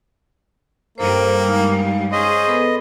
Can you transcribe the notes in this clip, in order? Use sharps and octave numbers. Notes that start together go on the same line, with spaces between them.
G2 G3 A#3 A4 C5
G#3 D#4 F5
C#4 G#4 C5 D#5
B3 A4 B4